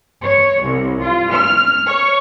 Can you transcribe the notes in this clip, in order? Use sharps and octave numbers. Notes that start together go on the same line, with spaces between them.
C#5
C2
F4
F6
C#5